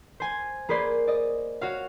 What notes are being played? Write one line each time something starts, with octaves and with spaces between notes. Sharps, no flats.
C5 G#5
A#3 G#4 B4 C5 D5
D5 D#5
F#4 C#5 F5